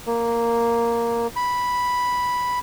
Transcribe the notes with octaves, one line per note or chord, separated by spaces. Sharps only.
A#3
B5